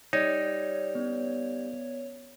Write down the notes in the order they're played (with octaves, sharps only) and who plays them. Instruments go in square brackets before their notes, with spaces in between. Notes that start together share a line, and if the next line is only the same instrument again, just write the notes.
[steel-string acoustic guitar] G3 [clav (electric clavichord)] D#4 [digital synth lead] C#5
[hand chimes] B3 C#4